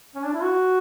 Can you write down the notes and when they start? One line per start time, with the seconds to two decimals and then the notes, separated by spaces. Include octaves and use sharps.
0.15 C#4
0.24 D4
0.33 E4
0.43 F#4